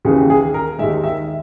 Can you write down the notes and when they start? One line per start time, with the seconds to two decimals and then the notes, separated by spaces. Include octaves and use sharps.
0.05 D#2 C#3 E3 G#4
0.30 G#4
0.54 A#4
0.79 D#2 D#3 G#3 E5
1.04 E5